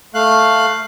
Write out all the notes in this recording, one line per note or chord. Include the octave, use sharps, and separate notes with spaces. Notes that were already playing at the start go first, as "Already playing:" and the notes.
A3 F5 F#6